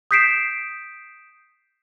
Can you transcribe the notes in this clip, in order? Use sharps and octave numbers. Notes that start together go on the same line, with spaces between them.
D#6 G6 B6 C7 D7 E7